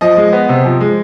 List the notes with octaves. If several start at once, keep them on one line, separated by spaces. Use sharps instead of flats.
F3 D#5
G#3
B3
C3
F3
G#3